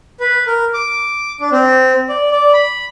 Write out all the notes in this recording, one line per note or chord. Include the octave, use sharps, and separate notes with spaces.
B4
A#4
D6
D4
C4
D5
D5
B5